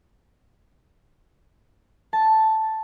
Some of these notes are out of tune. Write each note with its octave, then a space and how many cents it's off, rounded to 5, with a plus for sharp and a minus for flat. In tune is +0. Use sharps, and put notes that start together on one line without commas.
A5 +0